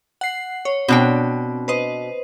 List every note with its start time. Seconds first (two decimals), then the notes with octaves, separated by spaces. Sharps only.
0.21 F#5 C7
0.65 C#5
0.88 B2 C4 D4 G5
1.68 B4 C5 D#5